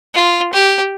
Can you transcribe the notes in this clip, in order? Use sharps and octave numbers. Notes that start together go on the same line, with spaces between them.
F4
G4